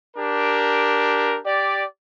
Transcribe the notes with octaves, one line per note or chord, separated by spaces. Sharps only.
D4 G4 A#4
G4 D5